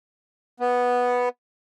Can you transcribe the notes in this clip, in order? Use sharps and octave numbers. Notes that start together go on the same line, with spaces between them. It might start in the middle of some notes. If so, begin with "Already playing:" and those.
B3